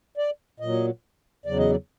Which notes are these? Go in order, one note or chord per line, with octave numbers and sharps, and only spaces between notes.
D5
A#2 F#3 D#5
E2 C#3 F#3 D5
D#5
D5